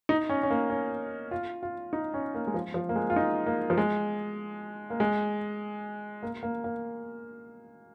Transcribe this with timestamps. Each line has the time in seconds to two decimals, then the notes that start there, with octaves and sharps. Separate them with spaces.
0.09 D#4
0.29 C#4
0.43 C#4
0.50 A#3
0.70 C#4
1.31 F4
1.63 F4
1.93 D#4
2.14 C#4
2.34 A#3
2.47 G#3
2.54 F3
2.74 F3
2.89 A#3
2.96 G#3
3.10 F4
3.16 D#4
3.46 A#3
3.70 F3
3.77 G#3
4.90 A#3
5.00 G#3
6.23 A#3
6.43 A#3
6.64 A#3